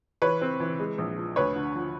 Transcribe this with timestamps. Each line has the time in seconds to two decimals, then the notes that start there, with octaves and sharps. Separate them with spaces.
0.22 E3 B4 C#5
0.41 C4
0.60 E3
0.80 G#3
0.98 A#1
1.17 F3
1.36 D2 B4 C#5
1.55 D3
1.75 F3